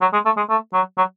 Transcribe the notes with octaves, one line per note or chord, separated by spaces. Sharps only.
F#3
G#3
A3
G#3
A3
F#3
F#3